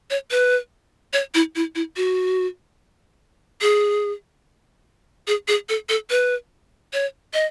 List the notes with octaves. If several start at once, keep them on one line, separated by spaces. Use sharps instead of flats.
C#5
B4
C#5
E4
E4
E4
F#4
G#4
G#4
G#4
A4
A4
B4
C#5
D#5